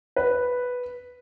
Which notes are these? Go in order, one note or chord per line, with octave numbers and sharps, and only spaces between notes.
B4